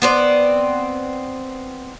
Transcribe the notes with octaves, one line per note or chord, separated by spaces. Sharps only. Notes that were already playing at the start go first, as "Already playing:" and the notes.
B3 C4 D5